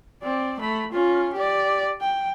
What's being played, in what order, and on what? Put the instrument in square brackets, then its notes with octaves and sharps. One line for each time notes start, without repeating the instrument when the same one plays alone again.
[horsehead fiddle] C4 D5
A3 B5
C#4 F4
G4 D5
G5